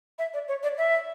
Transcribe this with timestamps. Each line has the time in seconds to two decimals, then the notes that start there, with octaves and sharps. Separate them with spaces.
0.19 E5
0.34 D5
0.48 C#5
0.63 D5
0.78 E5